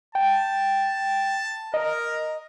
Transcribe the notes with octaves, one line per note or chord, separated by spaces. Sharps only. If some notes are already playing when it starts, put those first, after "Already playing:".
G5 A5
A#4 D#5